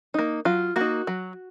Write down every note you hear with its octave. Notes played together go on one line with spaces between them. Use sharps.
A#3 D#4
F#3 F4
A#3 D#4 F#4
F#3